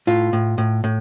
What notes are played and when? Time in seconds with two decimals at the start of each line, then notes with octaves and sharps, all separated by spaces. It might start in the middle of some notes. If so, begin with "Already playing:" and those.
0.07 A2 F4
0.33 A2
0.58 A2
0.84 A2